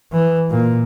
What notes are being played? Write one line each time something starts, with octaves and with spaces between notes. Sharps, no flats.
E3
A#2